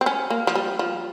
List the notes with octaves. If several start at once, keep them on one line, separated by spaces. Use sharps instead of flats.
C4
C#4
A#3
F3
G3
F3